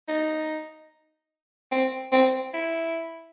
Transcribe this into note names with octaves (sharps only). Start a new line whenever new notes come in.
D#4
C4
C4
E4